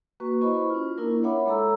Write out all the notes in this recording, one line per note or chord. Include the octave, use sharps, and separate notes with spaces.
A#3 F#4 B4 C#6
E4 C5 D#5 A5 B5 C#6
C#4 F4
A#3 D4 E4 A#4
C#5 E5 F#5 B5 D6
G#3 A4 A#5 E6